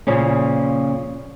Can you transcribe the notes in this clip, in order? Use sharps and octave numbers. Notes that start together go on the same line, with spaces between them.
A#2 C#3 F3 C#4